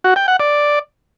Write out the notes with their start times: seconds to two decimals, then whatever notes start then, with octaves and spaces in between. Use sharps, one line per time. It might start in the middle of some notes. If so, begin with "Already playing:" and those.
0.04 F#4
0.16 G5
0.28 F#5
0.40 D5